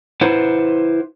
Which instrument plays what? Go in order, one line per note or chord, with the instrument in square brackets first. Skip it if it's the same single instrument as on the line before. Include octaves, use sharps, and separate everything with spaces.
[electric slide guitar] E4 B4 C5 F#5